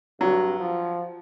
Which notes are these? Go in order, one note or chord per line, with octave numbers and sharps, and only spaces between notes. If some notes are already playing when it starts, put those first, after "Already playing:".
G2 F#3
F3